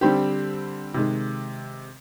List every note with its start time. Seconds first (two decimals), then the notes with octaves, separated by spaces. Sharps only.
0.01 D3 G3 C4 G4
0.94 C3 D#3 G#3